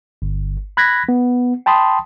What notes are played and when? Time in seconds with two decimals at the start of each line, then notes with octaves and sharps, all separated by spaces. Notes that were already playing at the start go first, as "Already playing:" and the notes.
0.22 G1
0.77 B5 F#6 G#6 A#6 B6
1.09 B3
1.66 G5 A5 B5 C6 D#6